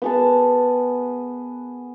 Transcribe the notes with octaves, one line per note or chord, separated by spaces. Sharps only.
B3 G#4 A5